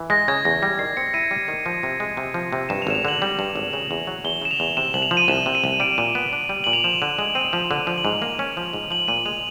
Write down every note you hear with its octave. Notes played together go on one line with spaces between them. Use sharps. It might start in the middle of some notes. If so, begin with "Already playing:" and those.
Already playing: E3
G#3 A#6
C#3 G#6
E2 A#6
G3 A#6
D#3 C7
C4 C#7
E4 D#7
G3
D#3
F3
C3
G#3
C3
F3
C3
G2 E7
F7
G#1 E7
F7
D3 F#7
G3
G2
G#1
C#3
E2
F#3
E2 G7
C#3 E7
F7
E2
C3 E7
C2 F#7
F7
F3
D#7
C2 E7
C3
D#7
C2
G3 D7
A#2
B3
D4
G3
A#2 F#7
F7
F3 E7
D3
G#3
C4 D#7
F3
D3
F3 F7
F#7
G#2 F7
A#3
C#4
F3
G#2
F3 F#7
A#2 D#7
G#3 F7